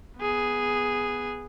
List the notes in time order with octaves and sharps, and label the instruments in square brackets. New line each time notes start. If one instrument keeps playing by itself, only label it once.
[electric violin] B3 G#4